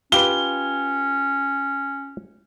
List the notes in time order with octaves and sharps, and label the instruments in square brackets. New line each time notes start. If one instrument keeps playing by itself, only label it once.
[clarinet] C#4 [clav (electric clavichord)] F4 G4 B4 [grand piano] G7